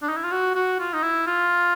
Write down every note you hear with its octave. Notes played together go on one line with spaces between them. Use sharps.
D4
D#4
E4
F4
F#4
F#4
F4
D#4
E4
F4